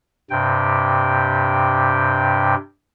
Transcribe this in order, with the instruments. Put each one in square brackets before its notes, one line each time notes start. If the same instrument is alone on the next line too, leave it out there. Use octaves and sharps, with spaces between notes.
[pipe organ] G2 C3 G5